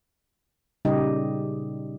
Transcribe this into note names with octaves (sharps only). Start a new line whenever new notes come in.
A#2 C#3 G3 D#4 G4 D#5